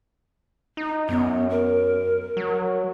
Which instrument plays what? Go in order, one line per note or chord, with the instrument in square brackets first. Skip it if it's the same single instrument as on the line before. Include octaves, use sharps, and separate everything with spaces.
[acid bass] D#4
[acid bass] F#2 [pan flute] B3
[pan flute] A#4
[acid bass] F#3